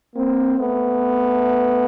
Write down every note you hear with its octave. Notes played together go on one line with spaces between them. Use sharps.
A#3 C4
A3 B3